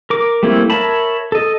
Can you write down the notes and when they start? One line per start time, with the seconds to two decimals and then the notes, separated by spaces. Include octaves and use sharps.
0.10 A#4 D6
0.43 G3 A3 A#3 C4 E4
0.70 A#4 C#5 E5 A5 B5
1.32 A4 D#5